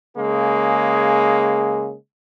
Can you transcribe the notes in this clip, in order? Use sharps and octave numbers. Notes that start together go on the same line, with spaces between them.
C#3 G#3 A#3 G#4